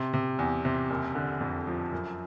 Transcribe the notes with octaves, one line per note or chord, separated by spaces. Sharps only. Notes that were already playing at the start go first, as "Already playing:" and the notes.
Already playing: C3
C3
E2
C3
F#1
D3
F2
F3
F#2